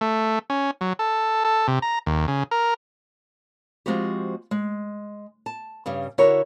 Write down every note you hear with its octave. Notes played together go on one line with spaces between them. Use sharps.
A3
C#4
F#3
A4
A4
C3
A#5
D#2
C#3
A#4
F3 F#3 G#3 C4 F#4 G4
G#3
A5
G2 C#3 G3
D3 E4 F#4 A#4 C#5